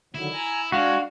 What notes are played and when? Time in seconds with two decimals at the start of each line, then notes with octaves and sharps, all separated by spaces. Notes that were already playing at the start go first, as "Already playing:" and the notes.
0.14 D3 D#3 F#3 E4
0.33 G#5 A#5
0.72 G#3 D4 F#4 F5